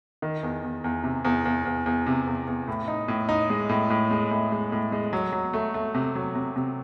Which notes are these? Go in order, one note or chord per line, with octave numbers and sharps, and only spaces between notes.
D#3
E2
E2
E2
C3
E2
E2
E2
E2
C3
E2
E2
A2
D#4
A2
D#4
G#3
A2
A2
G#3
A2
G#3
A2
G#3
F#3
F#3
A3
A3
C3
F#3
C3
C3